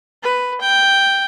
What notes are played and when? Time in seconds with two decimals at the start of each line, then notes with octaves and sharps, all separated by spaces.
0.23 B4
0.61 G5